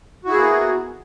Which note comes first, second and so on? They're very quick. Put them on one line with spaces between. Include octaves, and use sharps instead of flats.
F#4 E4 G#4 A#3 B3